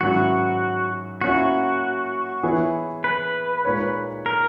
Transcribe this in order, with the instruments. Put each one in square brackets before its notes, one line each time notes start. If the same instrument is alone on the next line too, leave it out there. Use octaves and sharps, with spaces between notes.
[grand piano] G#2 D#3 F#3 C#4 E4 [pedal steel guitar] F#4
[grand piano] A#3 C#4 E4 [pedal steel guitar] F#4
[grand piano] E3 B3 E4 G#4 C#5
[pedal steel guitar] B4
[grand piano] A#2 G#3 D#4 A#4 C#5
[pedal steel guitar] A#4